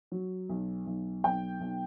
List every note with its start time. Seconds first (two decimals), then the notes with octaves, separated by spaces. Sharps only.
0.12 F#3
0.49 B1
0.86 B1
1.24 B1 G5
1.61 B1